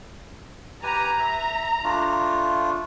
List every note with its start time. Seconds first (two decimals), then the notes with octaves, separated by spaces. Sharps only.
0.83 G4 B4 G#5 A#5
1.20 E5
1.84 A3 D4 F4